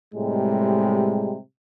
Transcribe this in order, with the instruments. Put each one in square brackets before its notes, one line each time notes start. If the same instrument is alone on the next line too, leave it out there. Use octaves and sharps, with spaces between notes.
[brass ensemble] A2 C3 G3 G#3